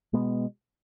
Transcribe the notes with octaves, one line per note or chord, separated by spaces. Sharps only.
B2 G#3 B3